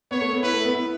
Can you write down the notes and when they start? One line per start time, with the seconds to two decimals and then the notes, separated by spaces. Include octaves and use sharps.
0.11 B3 C#5
0.21 A3
0.33 B3
0.43 E4 B4
0.53 A3
0.65 B3
0.74 E4